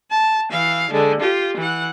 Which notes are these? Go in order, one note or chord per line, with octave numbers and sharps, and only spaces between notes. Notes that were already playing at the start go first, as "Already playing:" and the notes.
A5
E3 F5
D3 G#3
F4 G4
E3 F#5